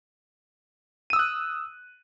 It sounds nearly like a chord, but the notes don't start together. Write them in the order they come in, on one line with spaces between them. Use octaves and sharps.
D#7 E6 D#6 F#6